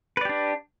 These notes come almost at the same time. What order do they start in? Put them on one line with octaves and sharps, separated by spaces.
B4 D5 G4 D4